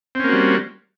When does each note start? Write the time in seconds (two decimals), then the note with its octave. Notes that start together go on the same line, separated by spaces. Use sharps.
0.15 C4
0.20 C#4
0.24 A#3
0.29 F#4
0.33 G3